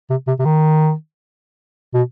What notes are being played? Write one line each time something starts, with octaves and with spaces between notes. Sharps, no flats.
C3
C3
C3
D#3
B2